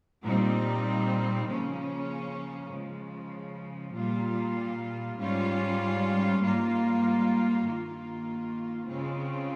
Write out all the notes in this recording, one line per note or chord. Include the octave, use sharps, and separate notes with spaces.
A#2 G3 C4 D#4
C#3 F3 A#3 C#4
C#3 F3 G#3
A#2 G3 A#3 F4
G#2 G3 C#4 F4
G#2 G3 A#3 F4
G2 D#3 A#3 F4
C#3 G#3 C4 F4